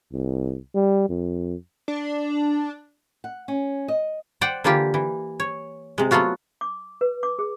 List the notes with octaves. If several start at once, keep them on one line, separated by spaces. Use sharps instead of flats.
C2
G3
F2
D4
F#5
C#4
D#5
C5 D5 F#5 G5
D3 E3 A#3 F4 G4
E3
C#5
C3 G#3
F#3 A3 B3 F4 F#4
D6
B4
D6
G#4